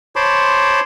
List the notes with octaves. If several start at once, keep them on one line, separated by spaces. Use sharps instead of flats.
C5 C#5 A5 B5 C6 D6